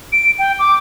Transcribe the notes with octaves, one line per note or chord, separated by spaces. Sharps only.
D7
G5
D6